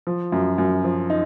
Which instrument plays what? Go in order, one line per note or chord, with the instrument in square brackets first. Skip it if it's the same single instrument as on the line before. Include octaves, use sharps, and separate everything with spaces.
[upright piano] F3
F#2
F#2
F3
D#4